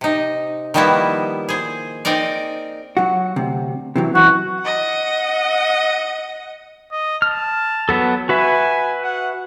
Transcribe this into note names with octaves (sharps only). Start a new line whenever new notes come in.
C3 D#4
D#3 F3 G3 A#3 B3 E4
G#4 C5
C4 D#4 A#4 D5
F#3 F#4
D2 C3
C3 E3 F#3
F#2 E3 F#4
D#5 F#5
D#5
A5 F6
F#3 B3 A4
F#4 B4 E5 G#5
F#5